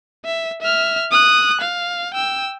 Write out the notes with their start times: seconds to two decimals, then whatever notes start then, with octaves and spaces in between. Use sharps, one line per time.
0.25 E5
0.62 E5 F6
1.11 D#6 F#6
1.61 F5
2.14 G5 E6